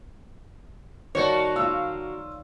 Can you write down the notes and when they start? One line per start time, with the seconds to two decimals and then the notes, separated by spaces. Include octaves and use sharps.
1.15 D#3 G3 A#3 F#4 C#5 A5
1.56 F4 F5 G5 E6